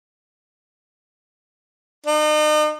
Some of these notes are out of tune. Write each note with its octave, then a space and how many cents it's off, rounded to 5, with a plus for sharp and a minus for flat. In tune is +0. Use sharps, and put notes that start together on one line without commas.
D#4 -40